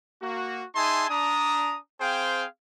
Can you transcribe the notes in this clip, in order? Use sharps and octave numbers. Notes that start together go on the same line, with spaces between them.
A#3 F#4
D#4 G#4 E5 G#5 A5 C6
D4 A#5 D#6
C4 G#4 C5 F5 G5